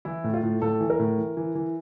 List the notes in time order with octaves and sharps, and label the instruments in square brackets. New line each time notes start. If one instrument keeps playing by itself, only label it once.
[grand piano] E3 E4
A2
F4
A2
A2 A4
E3
A#4
A2
E3
E3
E3